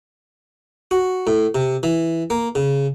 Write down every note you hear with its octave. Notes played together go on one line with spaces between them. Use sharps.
F#4
A2
C3
E3
A#3
C#3